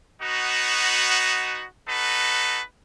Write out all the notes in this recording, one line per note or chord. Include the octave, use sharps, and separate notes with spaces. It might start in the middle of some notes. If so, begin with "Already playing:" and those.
B3 D#4 F#4
D#4 F#4 A4 B4